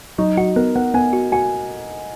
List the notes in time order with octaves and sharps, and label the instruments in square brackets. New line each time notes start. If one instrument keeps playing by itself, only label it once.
[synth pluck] F#3 [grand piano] D#4
[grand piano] D#4 [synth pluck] F#4
[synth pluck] B3 [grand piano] A#4
[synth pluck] B3 [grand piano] F#5
[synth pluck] B3 [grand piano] G#5
[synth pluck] F#4
[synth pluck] F#4 [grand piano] G#5